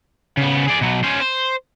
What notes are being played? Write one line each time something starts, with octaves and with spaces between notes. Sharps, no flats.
C#3 B3
G#4 D5
B2 F#3
C#4 C5
C5